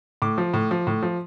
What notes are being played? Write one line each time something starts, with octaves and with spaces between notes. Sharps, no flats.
A2 D6
F3
A2
F3
A2
F3